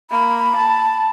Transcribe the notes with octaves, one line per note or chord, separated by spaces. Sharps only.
A#3 B5
A5